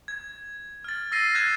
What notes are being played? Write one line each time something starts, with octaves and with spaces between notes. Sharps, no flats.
G#6
F6 A6
E6 A6 A#6 C7 D#7
F#6 G#6 E7